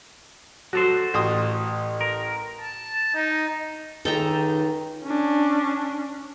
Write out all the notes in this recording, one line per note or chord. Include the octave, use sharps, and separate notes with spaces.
F#3 F#4 A4 C5
A1 C6 D#6
A#4
A5
D#4
C#2 D#3 A4 G5 A#5
C#4 D4